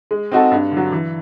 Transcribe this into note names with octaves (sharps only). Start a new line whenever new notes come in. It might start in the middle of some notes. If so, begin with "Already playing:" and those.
G#3
C4 D#4 F#4 A4
G2
D3
F#3
E3